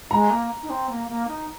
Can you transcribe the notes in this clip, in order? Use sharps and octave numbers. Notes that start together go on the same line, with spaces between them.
G#3 A#5
A#3
D#4
C4
A#3
A#3
D#4